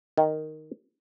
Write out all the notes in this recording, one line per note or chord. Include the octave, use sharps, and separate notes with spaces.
D#3